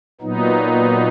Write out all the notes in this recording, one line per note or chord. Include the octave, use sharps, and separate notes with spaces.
A#2 F#3 B3 D#4